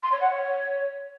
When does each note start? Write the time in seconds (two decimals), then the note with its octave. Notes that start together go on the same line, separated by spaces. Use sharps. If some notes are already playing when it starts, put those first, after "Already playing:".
0.03 C6
0.12 C#5
0.21 F#5
0.30 C#5